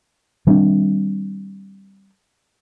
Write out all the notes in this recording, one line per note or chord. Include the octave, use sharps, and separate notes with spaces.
D#3 G3 C4 D4